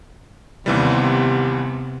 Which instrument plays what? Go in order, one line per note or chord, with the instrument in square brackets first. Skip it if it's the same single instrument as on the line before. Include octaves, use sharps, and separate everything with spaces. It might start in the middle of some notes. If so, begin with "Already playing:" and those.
[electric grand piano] D#2 E3 G3 [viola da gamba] C3 B3